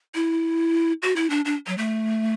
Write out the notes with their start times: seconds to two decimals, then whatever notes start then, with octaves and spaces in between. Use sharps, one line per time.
0.15 E4
1.02 F#4
1.16 E4
1.30 D4
1.45 D4
1.67 F#3
1.78 A3